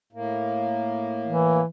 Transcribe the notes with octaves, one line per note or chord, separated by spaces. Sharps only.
A2 A#3
E3